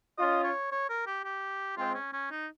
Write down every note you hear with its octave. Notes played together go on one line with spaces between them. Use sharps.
C#4 F4 D#5
C#5
C#5
A#4
G4
G4
G#3 C4 F4
C#4
C#4
D#4